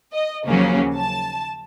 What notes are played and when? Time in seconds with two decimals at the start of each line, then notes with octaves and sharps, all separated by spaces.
0.12 D#5
0.46 D#2 C#3 F3 F#3 A#3 C#4
0.97 A5